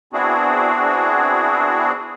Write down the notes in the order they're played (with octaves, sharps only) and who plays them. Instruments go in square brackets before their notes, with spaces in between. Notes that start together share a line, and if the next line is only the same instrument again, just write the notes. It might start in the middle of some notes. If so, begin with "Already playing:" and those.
[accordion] B3 C4 D4 E4 F#4 G#4